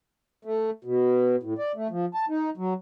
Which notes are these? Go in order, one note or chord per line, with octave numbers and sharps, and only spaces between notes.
A3
B2
A2
D5
A3
F3
A5
D#4
F#3